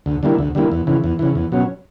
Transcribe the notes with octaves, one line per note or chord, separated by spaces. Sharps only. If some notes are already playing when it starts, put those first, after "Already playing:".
D2
D3 G3 A#3 E4
D2
D3 G3 A#3 E4
E2
C#3 E3
E2
C#3 E3
E2
B2 F#3 C#4